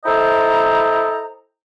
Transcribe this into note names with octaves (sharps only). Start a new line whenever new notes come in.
E4 A4 C5 D#5 G5 A#5